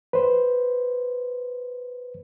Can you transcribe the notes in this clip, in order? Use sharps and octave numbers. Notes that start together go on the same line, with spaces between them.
B4 C5